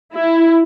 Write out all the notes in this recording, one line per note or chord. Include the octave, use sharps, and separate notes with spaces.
E4